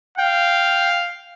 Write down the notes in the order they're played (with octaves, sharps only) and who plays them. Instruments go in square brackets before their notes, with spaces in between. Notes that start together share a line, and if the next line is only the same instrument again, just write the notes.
[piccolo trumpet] F5 [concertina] G5